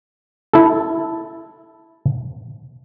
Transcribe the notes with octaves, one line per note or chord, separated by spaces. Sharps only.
E4 A4